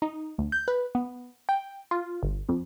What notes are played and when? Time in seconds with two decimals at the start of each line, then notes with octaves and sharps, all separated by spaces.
0.02 D#4
0.38 D2
0.52 G6
0.68 B4
0.95 B3
1.49 G5
1.91 F4
2.23 G1
2.49 F2